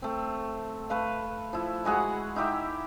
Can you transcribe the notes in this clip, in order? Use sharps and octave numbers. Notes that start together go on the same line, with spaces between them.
A3 C4
A3 B4 F5
F3 E4
G#3 F#4 G#4 F#5
D#4 E4 G4 E5